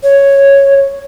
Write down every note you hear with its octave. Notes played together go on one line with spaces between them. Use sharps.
C#5